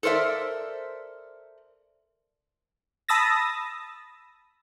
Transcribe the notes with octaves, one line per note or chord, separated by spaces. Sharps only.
A4 A#4 C5 D5 E5
A5 B5 D#6 E6 A6 A#6